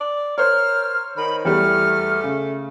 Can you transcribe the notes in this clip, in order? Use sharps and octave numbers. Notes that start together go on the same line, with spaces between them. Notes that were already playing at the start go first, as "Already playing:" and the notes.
D5
A#4 C5 C#5 F6
D#3 B5
E2 G3 A3 F6
C#3